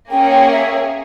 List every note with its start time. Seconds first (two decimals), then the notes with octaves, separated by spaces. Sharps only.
0.10 A#3 C#4 G#4 C#5 G5
0.31 G5
0.51 E5